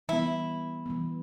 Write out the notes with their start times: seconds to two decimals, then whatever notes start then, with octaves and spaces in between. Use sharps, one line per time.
0.09 E3 G3 B3 E4
0.86 E3 G3 B3